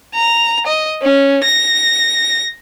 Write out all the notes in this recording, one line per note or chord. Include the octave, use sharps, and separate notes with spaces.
A#5
D#5
C#4
A#6